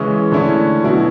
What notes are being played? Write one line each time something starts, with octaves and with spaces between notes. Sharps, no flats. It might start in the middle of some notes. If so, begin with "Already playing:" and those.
Already playing: C#3 E3 G#3 C#4 E4
D3 A3 C#4 E4
B2 F#3 C#4 E4